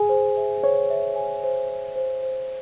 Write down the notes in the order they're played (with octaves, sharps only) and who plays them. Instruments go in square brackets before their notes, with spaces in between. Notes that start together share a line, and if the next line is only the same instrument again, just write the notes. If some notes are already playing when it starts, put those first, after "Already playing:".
Already playing: [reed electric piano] G#4 [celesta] G#5
[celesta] C5
E5
[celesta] C5 [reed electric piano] C#5
[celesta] E5
G#5
C5
C5
C5
C5